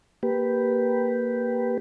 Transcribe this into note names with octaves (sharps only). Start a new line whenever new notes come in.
A#3 G4 B4